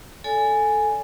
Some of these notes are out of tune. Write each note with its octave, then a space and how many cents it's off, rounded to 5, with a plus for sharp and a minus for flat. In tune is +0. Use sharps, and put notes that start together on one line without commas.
A4 +0 D5 -45 G#5 +0